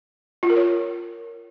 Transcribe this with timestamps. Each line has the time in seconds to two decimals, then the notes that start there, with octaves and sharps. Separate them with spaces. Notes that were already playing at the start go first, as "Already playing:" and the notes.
0.43 F4
0.50 A#4
0.56 C#5